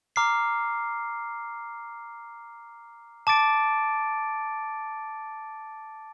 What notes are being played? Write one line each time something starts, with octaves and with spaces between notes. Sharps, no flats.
A#5 D6 F6 C7
A5 D6 A6 D7